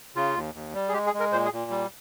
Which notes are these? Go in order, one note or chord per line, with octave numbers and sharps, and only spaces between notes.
C#3 F4
D#2
D#2
G3
G#4
G#3 G4
G#4
G#3
A#4
A#2 C5
G#4
A#2
G3